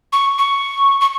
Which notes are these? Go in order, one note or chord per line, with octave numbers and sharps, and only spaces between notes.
C#6
C#6
C#6